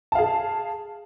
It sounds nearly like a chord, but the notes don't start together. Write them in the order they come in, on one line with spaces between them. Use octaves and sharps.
A5 F5 G#4